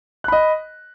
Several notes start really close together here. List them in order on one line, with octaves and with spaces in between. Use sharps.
F#6 B5 D#5